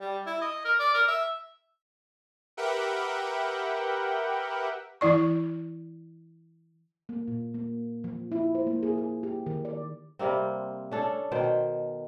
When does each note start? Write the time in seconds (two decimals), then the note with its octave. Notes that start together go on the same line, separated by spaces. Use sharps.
0.01 G3
0.27 E4
0.42 D#5
0.65 A#4
0.79 D5
0.94 A#4
1.08 E5
2.57 G4 A#4 B4 E5 F#5 G5
5.01 E3 E4 D5 C#6
7.09 A#3
7.28 A#2
7.54 A#3
8.04 F3
8.32 E4
8.55 C5
8.67 A#3
8.83 G#4
8.98 G#4
9.23 G4
9.46 D#3
9.65 D5
10.19 C3 G3 A#3 C4
10.91 C#4 D4 A4
11.31 B2 D#3 C5 G5